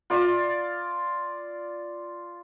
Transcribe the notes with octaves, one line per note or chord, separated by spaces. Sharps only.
F4 D5